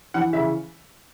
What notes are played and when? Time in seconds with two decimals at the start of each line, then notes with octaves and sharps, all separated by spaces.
0.14 E3 F#5
0.33 C#3 E5